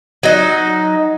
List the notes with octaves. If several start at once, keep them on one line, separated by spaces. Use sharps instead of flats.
F#3 D#4